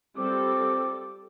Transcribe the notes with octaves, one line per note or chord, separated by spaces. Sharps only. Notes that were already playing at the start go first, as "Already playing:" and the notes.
G3 C4 F4 A4 D6